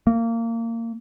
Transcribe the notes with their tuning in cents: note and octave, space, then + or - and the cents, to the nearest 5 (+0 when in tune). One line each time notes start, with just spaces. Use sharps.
A#3 -25